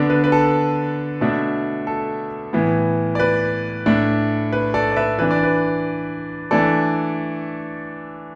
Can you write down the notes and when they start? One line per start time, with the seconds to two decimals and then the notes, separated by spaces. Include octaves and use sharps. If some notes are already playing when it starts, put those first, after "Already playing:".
Already playing: D3 B3 D4
0.10 B4
0.24 B4
0.32 A4
1.21 B2 A3 D4
1.87 A4
2.53 A2 E3 B3
3.15 D5
3.20 B4
3.86 A2 A3 D4
4.52 B4
4.74 A4 D5
4.92 D5
4.96 B4 E5
5.19 E3 D4 B4
5.31 D5
5.43 B4
6.51 E3 A3 D4 A4 D5